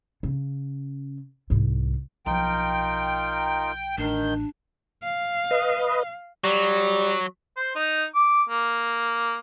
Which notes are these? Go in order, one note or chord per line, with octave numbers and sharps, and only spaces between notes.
C#3
C2 G#2
B1 F3 D#4 F4 A#4 G5
A1 D#3 D4 G6
F5
B4 D#5
F#3 G3
C5
D#4
D6
A#3